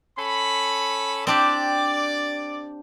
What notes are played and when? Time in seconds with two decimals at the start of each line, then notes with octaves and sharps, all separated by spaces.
0.17 C#4 A4 B5
1.27 C4 D4 G4 D5